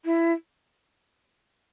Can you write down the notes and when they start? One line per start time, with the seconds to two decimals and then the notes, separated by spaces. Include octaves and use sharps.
0.05 E4